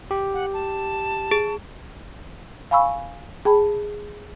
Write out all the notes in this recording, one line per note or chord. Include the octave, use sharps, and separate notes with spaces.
G4
F#5
A5
G#4
F5 G#5 B5 C#6 E6
G#4 G5 A5 B5